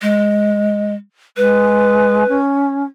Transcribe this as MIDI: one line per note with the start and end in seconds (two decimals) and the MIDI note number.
0.02 0.94 56
1.37 2.23 56
1.37 2.37 71
2.28 2.83 61